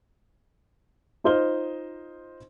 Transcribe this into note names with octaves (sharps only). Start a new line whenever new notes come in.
D#4 F4 C5 D#5 F6 G7